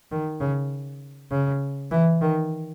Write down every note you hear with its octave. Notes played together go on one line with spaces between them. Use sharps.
D#3
C#3
C#3
E3
D#3